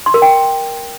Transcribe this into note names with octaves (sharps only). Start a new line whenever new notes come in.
C6
A#4
G5